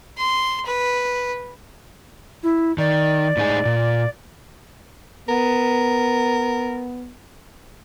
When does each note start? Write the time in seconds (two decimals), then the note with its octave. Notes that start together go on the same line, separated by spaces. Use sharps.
0.18 C6
0.66 B4
2.43 E4
2.78 D#3 D5
3.37 A2 D#4 G#4
3.65 A#2
5.28 B3 A#4